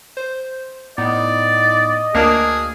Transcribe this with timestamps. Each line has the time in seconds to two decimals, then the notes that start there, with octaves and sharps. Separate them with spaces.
0.17 C5
0.98 A2 B3 D#4 D5 D#5
2.15 D2 A#3 D4 G#4 A#4